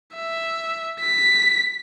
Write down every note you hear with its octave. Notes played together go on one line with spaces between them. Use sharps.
E5
B6